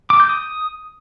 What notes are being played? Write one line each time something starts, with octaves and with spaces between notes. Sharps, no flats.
D6
G6
D#6